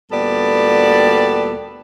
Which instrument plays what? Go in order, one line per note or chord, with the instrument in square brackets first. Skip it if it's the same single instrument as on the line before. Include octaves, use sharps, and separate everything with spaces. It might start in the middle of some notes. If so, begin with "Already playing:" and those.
[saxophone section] D2 A#2 G3 B3 A4 D5